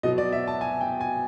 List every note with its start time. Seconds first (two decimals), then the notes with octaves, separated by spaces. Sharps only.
0.03 B2 F#3 D#5
0.18 D5
0.32 E5
0.48 A5
0.61 G#5
0.81 G5
1.01 G#5